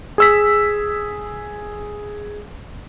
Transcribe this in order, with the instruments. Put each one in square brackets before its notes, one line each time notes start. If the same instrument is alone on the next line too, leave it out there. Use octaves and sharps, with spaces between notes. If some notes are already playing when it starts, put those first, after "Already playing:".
[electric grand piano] G#4 E6 B6